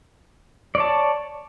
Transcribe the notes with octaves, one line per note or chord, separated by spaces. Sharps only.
C#5 D5 A5